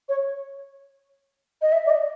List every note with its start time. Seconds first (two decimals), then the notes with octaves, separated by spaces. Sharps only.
0.09 C#5
1.62 D#5
1.72 E5
1.86 D5
1.90 D#5